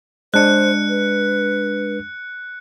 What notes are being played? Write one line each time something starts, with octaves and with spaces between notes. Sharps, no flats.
G#3 D4 C5 F#6 C#7
B4